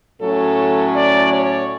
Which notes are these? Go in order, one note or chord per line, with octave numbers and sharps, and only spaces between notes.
A2 F#3 C#4 A4
D5
C#5